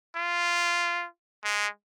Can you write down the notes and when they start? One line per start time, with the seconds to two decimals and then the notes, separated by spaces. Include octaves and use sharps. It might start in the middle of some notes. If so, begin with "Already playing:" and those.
0.16 F4
1.45 G#3